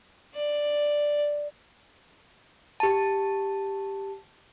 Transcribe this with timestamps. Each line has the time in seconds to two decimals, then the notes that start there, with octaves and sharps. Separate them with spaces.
0.35 D5
2.80 G4 A5